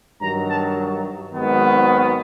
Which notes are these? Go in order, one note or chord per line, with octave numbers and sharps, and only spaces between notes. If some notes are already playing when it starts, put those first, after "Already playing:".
G2 D#3 F#3 A#5
A5
G#1 G#2 D#3 F#3 B3